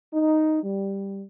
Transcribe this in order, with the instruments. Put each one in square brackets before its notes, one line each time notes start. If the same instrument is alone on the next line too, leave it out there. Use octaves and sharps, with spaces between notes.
[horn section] D#4
G3